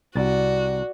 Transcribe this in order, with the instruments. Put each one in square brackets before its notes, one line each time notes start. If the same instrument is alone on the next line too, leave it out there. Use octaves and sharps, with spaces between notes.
[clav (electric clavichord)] C2 [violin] F#4 [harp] D5 A6